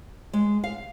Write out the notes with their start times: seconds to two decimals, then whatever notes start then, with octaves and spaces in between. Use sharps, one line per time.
0.33 G#3
0.64 F5